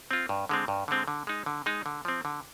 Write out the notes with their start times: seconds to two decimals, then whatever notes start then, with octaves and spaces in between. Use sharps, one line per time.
0.11 C4 F4
0.29 G2
0.49 D3 G#3 C4
0.68 G2
0.88 D3 G#3 C4
1.08 D3
1.27 G#3 D#4
1.46 D3
1.66 G#3 D#4
1.86 D3
2.05 F3 C4
2.25 D3